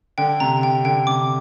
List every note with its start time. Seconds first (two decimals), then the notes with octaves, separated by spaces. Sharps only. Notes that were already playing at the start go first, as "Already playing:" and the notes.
0.18 D3 G5
0.40 C3 A#5
0.63 G5
0.85 D3 G5
1.07 C3 D6